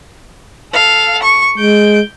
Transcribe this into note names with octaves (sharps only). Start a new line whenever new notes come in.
A4 F5
C#6
G#3 G6 D7